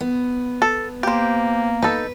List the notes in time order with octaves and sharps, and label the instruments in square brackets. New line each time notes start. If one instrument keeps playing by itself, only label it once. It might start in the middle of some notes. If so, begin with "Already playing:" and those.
[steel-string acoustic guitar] B3
[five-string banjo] A4
[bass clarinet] A#3 [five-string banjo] G4 C5
[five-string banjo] D#4 A4 [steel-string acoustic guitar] B4